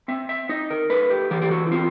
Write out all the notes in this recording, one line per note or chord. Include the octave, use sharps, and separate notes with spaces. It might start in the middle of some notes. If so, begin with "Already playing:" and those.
C4 E5
E5
D#4 D#5
A#4
A3 B4
G4
E3 G4
G4
F#4
E4
C4 F4